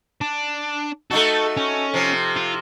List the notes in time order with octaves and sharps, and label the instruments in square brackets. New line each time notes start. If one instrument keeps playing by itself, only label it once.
[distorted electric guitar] D4
[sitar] A3 D#4 F#4 [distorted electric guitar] A4
[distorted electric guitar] C#4
[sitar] C3 F3
[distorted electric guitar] F4